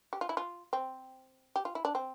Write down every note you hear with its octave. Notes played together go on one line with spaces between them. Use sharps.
G4
F4
E4
F4
C4
G4
F4
E4
D4
C4